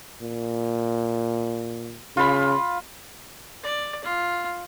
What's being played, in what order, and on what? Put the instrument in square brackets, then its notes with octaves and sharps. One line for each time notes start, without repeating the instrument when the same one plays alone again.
[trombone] A#2
[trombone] C#3 [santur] F4 B5
[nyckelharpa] D5
F4